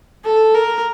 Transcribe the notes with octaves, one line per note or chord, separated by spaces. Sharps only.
A4
A#4